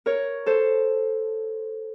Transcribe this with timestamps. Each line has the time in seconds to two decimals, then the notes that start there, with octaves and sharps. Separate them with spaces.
0.06 A#4 C#5
0.46 A4 C5